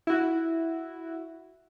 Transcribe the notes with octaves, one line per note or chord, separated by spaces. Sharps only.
E4 F#4